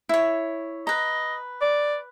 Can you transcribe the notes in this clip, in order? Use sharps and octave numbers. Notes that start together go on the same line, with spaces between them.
E4 C#5
B4 D#5 A#5
D5